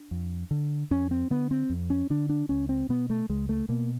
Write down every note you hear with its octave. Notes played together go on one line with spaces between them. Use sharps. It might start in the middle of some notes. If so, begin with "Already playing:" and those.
Already playing: D4
F2
D3
F2 C#4
C4
D3 B3
C4
F2
C#4
D3 D4
D4
C#2 C#4
C4
B2 B3
A3
C#2 G#3
A3
B2 A#3